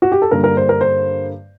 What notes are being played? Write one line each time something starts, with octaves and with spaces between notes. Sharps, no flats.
F#4
G4
A4
G2 D3 G3 A#3 A#4
A#4
C5
A#4
C5